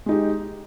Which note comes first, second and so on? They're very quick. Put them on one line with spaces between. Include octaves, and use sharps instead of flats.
G#3 D#4 G4